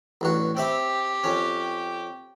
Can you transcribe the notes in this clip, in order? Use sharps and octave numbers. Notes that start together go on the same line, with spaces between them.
A1 G2 F#4
C4 G4 E5 B5
F2 C#4